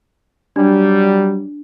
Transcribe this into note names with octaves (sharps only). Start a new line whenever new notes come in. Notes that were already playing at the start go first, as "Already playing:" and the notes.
F#3 G3 D4